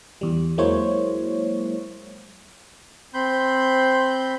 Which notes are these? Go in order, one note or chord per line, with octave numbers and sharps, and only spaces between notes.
E2 G3
F#3 G#3 A#3 E4 C5 C#5
C4 B5 C6 G6